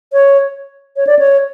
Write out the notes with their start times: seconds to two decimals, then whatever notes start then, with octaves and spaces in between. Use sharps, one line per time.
0.13 C#5
0.96 C#5
1.07 D5
1.19 C#5